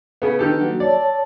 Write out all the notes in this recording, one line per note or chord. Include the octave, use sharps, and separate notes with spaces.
C#3 B3
D#3 D4 D#4 G4 A4 B4
F#3 A#3 F#4
C#5 D5 A5 E6